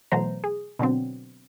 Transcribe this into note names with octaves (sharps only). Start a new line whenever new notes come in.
B2 E3 F#3 A3 C5 A#5
G#4
B2 D3 F#3 C4